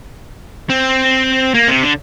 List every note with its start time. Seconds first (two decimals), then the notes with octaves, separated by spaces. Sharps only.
0.70 C4
1.55 A#3
1.68 C3
1.83 D3